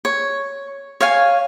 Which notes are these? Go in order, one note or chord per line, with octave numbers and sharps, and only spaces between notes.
C#5
C#5 F5 G#5